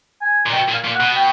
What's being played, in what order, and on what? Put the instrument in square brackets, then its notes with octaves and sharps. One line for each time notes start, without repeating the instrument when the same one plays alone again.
[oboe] G#5
[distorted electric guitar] A#2
[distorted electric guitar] B2 [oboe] G5
[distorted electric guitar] A#2
[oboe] F5
[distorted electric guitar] A#2
[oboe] F#5
[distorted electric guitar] B2
[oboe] G5